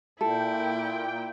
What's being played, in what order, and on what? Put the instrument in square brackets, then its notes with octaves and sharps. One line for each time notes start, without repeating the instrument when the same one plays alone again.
[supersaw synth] A#2 G5 [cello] E4 [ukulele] A4